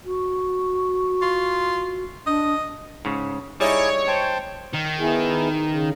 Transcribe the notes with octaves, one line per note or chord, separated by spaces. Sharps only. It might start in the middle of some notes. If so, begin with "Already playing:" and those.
F#4
F4
D4 D#5
G#2 C#3
G3 D#4 E4 G#4 C#5 D5
C5 G5 A5
D#3
B3 E4 G#4
C#3